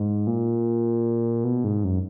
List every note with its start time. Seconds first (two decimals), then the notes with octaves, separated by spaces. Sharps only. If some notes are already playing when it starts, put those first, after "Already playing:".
Already playing: G#2
0.27 A#2
1.44 B2
1.64 G#2
1.84 F#2